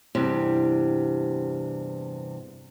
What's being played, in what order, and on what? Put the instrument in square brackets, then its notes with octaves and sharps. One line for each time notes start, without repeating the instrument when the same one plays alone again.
[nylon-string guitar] E2 G2 C3